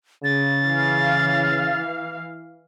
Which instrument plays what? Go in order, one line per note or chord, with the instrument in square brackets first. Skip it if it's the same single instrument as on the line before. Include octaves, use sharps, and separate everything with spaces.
[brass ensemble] C#3 [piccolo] A6
[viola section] E3 F5